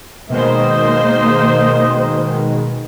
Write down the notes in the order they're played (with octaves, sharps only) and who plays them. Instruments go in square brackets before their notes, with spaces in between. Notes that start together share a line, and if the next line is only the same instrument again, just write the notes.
[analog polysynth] B2 D#3 G#3 [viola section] A#3 C5 [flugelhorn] D#5